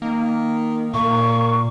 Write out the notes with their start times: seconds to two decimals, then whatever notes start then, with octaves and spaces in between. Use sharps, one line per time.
0.02 D#3 A#3
0.94 A#2 A#3 C#6